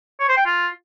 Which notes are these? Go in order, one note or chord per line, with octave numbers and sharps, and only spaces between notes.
C#5
C5
G5
F4